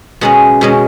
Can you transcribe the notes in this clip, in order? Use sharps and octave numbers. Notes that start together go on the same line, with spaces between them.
B2 G#3 C#4 F#5
B2 G#3 C#4